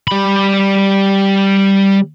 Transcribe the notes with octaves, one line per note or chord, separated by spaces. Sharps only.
G3 B5